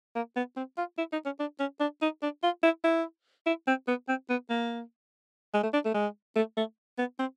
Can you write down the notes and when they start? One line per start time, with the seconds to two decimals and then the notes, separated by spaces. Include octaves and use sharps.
0.15 A#3
0.36 B3
0.56 C4
0.77 F4
0.98 E4
1.12 D#4
1.25 C#4
1.39 D4
1.59 C#4
1.80 D4
2.02 D#4
2.22 D4
2.43 F4
2.63 E4
2.84 E4
3.46 E4
3.67 C4
3.88 B3
4.08 C4
4.30 B3
4.50 A#3
5.53 G#3
5.63 A3
5.73 D4
5.85 A3
5.94 G#3
6.36 A3
6.57 A3
6.98 B3
7.19 C4